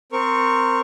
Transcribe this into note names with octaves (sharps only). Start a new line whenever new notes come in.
C4 A#4 C#6